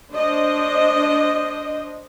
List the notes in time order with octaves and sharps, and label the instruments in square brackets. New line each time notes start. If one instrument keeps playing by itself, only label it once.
[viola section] D4 C5 D#5